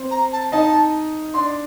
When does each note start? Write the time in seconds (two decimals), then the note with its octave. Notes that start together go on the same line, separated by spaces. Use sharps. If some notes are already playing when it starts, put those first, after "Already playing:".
Already playing: C4 C5
0.11 A#5
0.32 A5
0.52 D#4 D#5 A5
1.34 D4 D5 C6